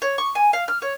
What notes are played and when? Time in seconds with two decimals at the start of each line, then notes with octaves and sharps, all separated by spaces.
0.02 C#5
0.18 C#6
0.35 G#5
0.53 F5
0.68 F6
0.82 C#5